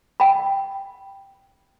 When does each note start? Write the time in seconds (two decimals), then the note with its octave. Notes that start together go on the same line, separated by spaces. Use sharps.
0.20 G5 B5